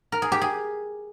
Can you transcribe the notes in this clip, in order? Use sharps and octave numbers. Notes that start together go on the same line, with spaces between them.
A#4
G#4
G4
G#4